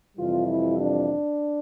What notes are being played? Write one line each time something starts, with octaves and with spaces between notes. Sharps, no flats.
F2 C3 E3 G3 F4
E4
D4